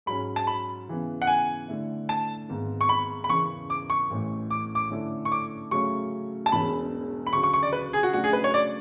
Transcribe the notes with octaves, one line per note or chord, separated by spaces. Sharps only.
G#2 F#3 C#4 B5
A5
B5
C#3 E3 B3
F#5
G#5
D3 A3 E4
A5
G#1 G#2 G#3 B3
C#6
B5
B5
F#1 E2 C#3 E3 C#6
D6
C#6
A1 A2 E3 A3
D6
D6
D3 A3 C#4 E4 A4
C#6
D6
C#3 F#3 A3 C#4 C#6
A5
E1 E2 B2 G#3 C#4 B5
B5
D2 C#3 F#3 C#6
C#6
C#6
D5
B4
G#4
F#4
C#3 F#3 A3 D4 F#4
G#4
B4
C#5
D5